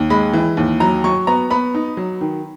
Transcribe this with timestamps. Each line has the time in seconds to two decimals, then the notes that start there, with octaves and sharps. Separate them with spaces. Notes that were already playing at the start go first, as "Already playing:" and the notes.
Already playing: D#2
0.10 G#3 B5
0.33 E3
0.57 D#2
0.80 F#3 A#5
1.04 F#3 C#6
1.27 B3 A#5
1.50 B3 B5
1.74 D#4
1.97 F#3
2.21 D#3